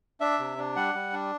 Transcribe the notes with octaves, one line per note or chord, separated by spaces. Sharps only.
D4 E5
C3
D4
G3 F#5
G3
D4